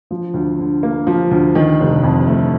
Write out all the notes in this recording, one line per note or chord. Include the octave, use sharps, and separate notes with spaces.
F3
D2
D3
A#3
F3
D2
D#3
F1
F2
A3